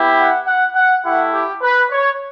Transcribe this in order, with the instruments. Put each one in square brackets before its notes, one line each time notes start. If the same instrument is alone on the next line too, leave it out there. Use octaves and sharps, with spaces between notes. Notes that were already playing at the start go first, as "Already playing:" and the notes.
Already playing: [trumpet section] B3 E4 G4
F#5
F#5
F#5
A3 E4 G4 F#5
G4
B4
C#5